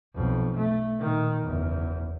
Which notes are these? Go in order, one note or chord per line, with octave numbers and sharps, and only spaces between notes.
B1 F2
A3
A#2 D#3
F#1 E2